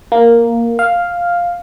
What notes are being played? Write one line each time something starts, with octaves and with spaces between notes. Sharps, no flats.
A#3
F5